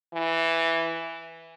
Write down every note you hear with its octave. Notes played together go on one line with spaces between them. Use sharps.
E3